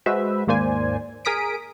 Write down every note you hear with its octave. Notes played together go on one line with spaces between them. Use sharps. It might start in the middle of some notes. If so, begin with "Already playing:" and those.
G#3 F#4 B4 C5 E5
D#2 G#2 A#3 C5 D5 G#5
G#4 A#4 D#6 B6 D7